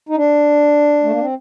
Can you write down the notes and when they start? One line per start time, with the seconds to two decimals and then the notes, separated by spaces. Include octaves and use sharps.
0.09 D#4
0.17 D4
1.04 A3
1.12 A#3
1.21 C4